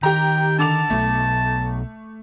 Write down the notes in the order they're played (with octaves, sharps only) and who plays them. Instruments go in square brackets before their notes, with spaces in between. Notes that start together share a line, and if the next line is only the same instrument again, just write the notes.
[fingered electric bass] D#3 [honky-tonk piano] G4 A#5 [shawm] G5
[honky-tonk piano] D3 D6 F7 [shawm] A5
[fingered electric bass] B1 B2 [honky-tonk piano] A3